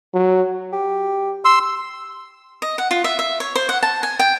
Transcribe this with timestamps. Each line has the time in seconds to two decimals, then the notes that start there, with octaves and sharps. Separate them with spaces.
0.14 F#3
0.73 G4
1.45 C6 E6
2.62 D#5
2.78 F#5
2.91 F4
3.04 E5
3.19 E5
3.40 C#5
3.55 C5
3.69 F#5
3.83 A5
4.03 G#5
4.19 G5